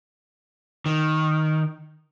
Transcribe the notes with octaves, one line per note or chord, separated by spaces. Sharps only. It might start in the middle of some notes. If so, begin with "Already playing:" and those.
D#3